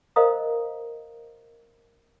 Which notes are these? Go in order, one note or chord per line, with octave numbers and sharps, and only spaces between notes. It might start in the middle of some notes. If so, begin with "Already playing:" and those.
A#4 C5 D#5 F5 A#5 D#6